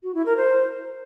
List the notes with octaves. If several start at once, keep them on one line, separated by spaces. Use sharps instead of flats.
F#4
E4
A#4
C5